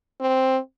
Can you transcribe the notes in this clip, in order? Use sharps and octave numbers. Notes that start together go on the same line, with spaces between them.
C4